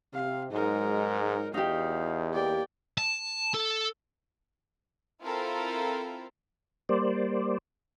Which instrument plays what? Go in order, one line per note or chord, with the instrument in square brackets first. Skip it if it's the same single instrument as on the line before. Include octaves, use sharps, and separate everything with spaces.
[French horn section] C3 [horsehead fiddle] F5
[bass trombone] G#2 [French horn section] F#3 G#3 [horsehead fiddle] D#4 A#4
[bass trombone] E2 [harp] D#4 G4 [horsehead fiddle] F#4 F5
[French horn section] A#3 G4 [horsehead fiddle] D5 G5
[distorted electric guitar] A5
A4
[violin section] C4 E4 F4 A4 A#4
[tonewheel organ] G3 A#3 C5 D5